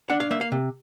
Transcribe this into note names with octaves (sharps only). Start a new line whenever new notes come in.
D4 F#5
F5
A#3 E5
F5
C3